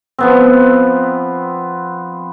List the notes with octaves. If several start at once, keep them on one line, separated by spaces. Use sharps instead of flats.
F3 B3 C4